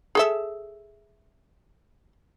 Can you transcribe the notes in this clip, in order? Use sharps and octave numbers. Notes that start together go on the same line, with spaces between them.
G#4 A4 E5